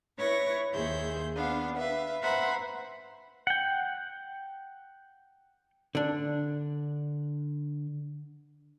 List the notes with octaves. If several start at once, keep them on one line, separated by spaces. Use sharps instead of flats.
E4 B4 C#5 C#6 A#6
D#2 G#4 C5 E5 G6
B3 D4 F5
B4 E5 F5
B4 C5 E5 F#5 A#5 B5
F#5 G5
D3 D4